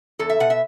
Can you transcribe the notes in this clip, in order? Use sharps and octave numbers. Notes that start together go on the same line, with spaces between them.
E2 A4
E5
B2 F#5
E5